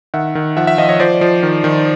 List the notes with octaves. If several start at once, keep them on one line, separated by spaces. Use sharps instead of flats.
D#3 E5 F#5
D#3
F3 E5 F#5
E5 F#5
F3 D#5 F5
C#5 D#5
F3 C5 D5
F3
D#3
D#3